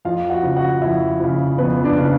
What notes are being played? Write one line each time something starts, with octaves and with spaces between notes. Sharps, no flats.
F2 F4 F5
F#4 F#5
C#3 F3
F#4 F#5
F2 E4 E5
C#3 F3
F2 B3 B4
D4 D5
C#3 F3